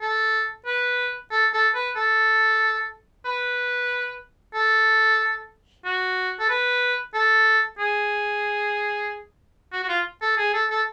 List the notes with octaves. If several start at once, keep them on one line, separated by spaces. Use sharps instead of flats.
A4
B4
A4
A4
B4
A4
B4
A4
F#4
A4
B4
A4
G#4
F#4
F#4
F4
A4
G#4
A4
A4